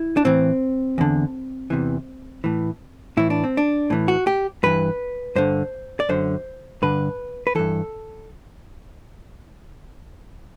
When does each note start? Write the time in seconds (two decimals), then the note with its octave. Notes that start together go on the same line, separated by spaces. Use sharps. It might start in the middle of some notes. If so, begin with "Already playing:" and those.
Already playing: E4
0.17 D4
0.25 A2 E3 C4
0.98 E2 D3
1.70 E2 C3 E3
2.44 A2 E3
3.17 A2 E3 E4
3.30 D4
3.44 C4
3.57 D4
3.90 A2 E3
4.08 F#4
4.27 G4
4.63 G2 E3 B4
5.36 G2 D3 C5
6.00 D5
6.09 F#2 D3 C5
6.82 G2 D3 B4
7.47 B4
7.55 G2 E3 A4